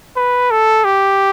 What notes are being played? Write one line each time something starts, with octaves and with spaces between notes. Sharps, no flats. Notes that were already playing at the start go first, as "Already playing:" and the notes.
B4
A4
G4